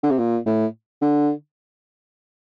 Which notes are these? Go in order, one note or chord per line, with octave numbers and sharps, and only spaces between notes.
D3
C3
A#2
A2
D3